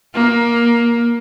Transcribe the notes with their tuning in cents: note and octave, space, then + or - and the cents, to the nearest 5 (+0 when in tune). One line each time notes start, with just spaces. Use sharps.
A#3 +15